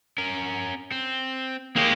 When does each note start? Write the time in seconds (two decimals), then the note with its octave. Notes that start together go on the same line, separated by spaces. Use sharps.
0.18 C#4 A#4
0.92 C4
1.76 G#3 A#3 G4